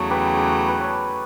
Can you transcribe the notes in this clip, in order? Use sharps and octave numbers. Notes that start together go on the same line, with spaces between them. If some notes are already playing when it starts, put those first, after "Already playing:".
Already playing: E2 C#3 F#3 A3 A4 C#5
G4 B4
B4
A4 C#5